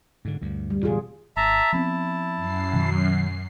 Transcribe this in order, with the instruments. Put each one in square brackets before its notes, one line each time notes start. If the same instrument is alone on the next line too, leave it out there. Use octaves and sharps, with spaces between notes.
[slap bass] G#2 D3
D2 G2
[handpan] G3
[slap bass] E1 A2 D3 [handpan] F4 G#4
[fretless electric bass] G#1 [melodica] E5 A5 A#5
[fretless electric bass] F3 B3 C4 [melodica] E4 A5
[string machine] F#2 C7
[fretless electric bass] B2 D#3 F#3